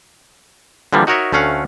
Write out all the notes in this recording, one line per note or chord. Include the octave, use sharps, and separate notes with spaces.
D3 E3 F3 G3 A#3
D#4 F#4 A#4 C#5 D#5 E5
D2 A3 C#4 F5 F#5